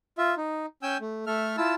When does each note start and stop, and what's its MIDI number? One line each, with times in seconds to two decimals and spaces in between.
0.18 0.35 65
0.18 0.35 76
0.37 0.66 63
0.83 0.97 61
0.83 0.97 79
0.83 0.97 80
0.83 0.97 88
0.83 0.97 91
1.00 1.25 57
1.27 1.56 57
1.27 1.56 69
1.27 1.56 76
1.27 1.56 89
1.57 1.75 64
1.57 1.75 65
1.57 1.75 81
1.57 1.75 88